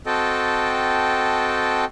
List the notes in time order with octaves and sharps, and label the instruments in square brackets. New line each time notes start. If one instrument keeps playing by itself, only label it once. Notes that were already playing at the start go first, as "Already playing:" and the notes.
[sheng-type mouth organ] C4 F#4 A4 D#5 G5 A5